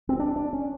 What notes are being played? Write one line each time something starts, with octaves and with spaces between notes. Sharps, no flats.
C4
D4
D4
C#4